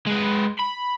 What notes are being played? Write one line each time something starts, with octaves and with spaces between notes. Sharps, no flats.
G#3 B4
B5